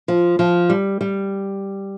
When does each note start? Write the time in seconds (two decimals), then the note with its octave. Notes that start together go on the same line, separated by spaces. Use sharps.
0.08 F3
0.39 F3
0.70 G3
1.01 G3